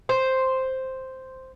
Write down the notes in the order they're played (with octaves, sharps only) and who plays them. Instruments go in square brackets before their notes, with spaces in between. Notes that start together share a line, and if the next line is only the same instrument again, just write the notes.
[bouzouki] C5